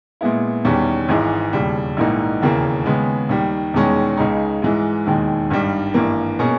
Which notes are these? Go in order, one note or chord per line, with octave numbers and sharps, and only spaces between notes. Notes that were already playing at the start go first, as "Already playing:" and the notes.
A#2 G#3 B3 E4
E1 E2 D#3 G3 C#4
G#1 G#2 E3 G#3
E1 D#2 C#3 G3
A#1 G#2 E3 A#3 D#4
E1 D#2 C#3 E3 A#3
D#2 C#3 G#3 B3
D#2 D#3 G3
E1 E2 D#3 G#3 C#4
C#2 C#3 G#3 D#4
G#2 E3 G#3
E1 D#2 D#3 G#3
G#1 G2 D#3 G3
G#1 G2 E3 A#3
B2 A#3 C#4 G#4